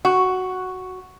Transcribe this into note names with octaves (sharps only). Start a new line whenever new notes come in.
F#4